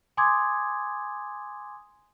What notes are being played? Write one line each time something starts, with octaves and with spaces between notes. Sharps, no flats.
G#5 C6 D6 D#6 G#6